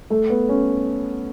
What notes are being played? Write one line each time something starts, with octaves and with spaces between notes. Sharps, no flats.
A3
B3
C#4